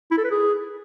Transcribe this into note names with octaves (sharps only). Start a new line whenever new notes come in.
E4
A4
B4
G#4